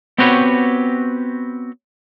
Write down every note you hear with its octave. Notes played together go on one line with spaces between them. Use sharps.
B3 C4 F#4 G4 B4 C#5